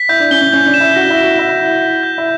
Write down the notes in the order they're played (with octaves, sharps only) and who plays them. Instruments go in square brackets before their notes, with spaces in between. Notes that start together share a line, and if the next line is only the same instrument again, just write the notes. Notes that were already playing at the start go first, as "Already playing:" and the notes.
Already playing: [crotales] B6
[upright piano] E4 [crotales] G6
[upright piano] D4
[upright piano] C#4 [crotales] G7
[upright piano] C#4
[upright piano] C#4 [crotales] G6
[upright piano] D4
[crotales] E7
[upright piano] E4
[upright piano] F#4 [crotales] A#6
[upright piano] E4
[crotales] E7
[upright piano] F#4
[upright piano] E4 [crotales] A#6
[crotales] A#6
B6
G6
[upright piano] E4